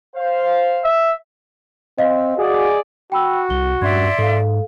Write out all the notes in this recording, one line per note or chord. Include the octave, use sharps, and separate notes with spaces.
C5 F5
E5
C4 D#5 F5
F#4 G#4 D5
F#4 G5 B5 E6
C2 G7
G2 C#4 D4 D5 E5 C6 G#6
G#2 A4 F5